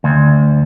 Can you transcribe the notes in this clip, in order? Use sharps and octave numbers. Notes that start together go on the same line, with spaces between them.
D2